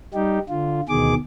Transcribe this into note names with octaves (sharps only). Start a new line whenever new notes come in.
G3 D#4 G4
D3 F4
D2 B2 D#3 G#4 D6